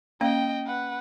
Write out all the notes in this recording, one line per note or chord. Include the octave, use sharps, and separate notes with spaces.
A#3 C#4 D#5 F5 G5
B4 F#5